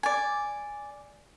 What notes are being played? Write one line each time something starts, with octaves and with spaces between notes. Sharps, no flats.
D5 G#5